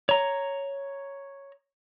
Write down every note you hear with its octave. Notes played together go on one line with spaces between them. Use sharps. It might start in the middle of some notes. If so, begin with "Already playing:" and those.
C#5 A#5